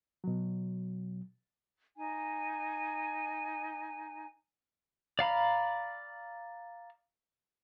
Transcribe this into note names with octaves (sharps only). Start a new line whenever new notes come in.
B2 F#3
D#4 G#5
D5 F5 A#5 B5